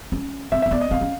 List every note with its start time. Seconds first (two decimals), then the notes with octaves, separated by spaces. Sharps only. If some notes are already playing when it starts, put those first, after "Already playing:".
0.12 C#4
0.52 C4 E5
0.62 C4 E5
0.71 B3 D5
0.81 D#5
0.91 C4 F5
1.01 C#4